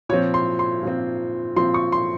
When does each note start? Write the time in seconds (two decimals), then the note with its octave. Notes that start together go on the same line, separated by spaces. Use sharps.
0.09 A#2 C#5
0.12 F3 C4
0.34 C6
0.59 C6
0.83 A#2 F3 C4
1.56 A#2 F3 C4 C6
1.74 C#6
1.92 C6